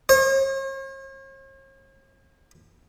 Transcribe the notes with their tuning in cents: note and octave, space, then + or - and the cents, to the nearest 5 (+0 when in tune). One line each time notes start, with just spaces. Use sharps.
C#5 -45